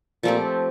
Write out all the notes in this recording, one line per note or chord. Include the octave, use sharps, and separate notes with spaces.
A#2 F3 A3 C4 G4